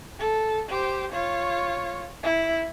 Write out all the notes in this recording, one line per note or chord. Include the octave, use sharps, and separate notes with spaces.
A4
G4 C5
F4 C#5
E4